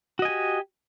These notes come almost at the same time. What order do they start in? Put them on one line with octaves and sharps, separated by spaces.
F#4 D#5 G#5 G4